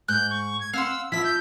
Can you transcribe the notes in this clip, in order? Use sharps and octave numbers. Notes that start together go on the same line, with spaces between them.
G#2 F#6 G6
C#6
G#6
C4 F5 F#5 C6 E6
F3 E4 E5 B6
G6